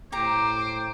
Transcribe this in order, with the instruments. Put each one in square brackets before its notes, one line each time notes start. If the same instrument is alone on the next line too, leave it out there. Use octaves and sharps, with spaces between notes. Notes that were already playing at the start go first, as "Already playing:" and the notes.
[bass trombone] A2 [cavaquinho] G4 A#5 [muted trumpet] C5 [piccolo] D6